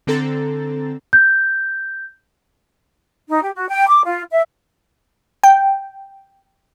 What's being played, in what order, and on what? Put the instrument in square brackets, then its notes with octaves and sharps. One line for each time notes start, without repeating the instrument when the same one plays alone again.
[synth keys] D3 C4 A4 A#5 A6
[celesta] G6
[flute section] D#4
G4
F#4
G5
D6
F4
E5
[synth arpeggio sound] G5